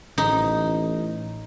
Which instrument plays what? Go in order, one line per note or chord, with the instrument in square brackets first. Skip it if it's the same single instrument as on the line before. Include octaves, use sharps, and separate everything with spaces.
[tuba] A1 [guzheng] D#4